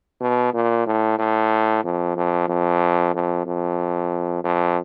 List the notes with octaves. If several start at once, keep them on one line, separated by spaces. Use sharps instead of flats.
B2
A#2
A2
A2
F2
F2
F2
F2
F2
F2